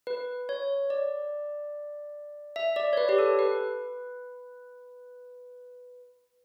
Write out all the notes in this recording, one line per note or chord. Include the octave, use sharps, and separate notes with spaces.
B4
C#5
D5
E5
D5
C#5
B4
G4
A4
B4